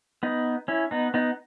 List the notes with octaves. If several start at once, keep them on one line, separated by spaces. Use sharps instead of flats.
B3 D#4
C#4 E4
B3 D#4
B3 D#4